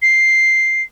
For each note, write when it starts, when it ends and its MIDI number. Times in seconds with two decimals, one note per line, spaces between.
0.02 0.82 96